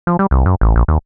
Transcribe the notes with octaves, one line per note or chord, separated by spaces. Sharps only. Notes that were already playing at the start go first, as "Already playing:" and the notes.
F3
G3
C2
F#2
A1
A#1
D#2